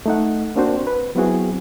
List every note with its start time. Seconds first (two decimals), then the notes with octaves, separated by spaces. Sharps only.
0.06 A3 D#4 F#5
0.56 A#3 C4 D4 F#4 C5
0.87 B4
1.15 F#3 B3 C4 E4 F#4 G#4